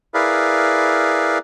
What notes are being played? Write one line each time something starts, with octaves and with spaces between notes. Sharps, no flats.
E4 G#4 A#4 B4 D5 F5